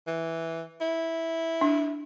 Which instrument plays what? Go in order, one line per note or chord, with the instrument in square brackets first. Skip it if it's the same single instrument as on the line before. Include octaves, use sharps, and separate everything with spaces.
[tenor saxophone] E3
E4
[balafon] D4